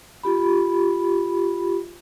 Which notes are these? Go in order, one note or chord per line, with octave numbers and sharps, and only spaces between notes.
F4 G4 B5